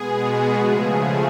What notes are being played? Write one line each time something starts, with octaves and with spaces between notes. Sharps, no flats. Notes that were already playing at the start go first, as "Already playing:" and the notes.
Already playing: B2 G#3 B3 G#4
F#4
C#3 F3 A3 G#4